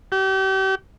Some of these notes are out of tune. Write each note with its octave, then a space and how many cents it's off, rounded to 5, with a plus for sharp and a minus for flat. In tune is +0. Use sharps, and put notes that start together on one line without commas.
G4 -35